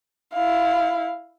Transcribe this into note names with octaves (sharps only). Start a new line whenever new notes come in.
E4 F5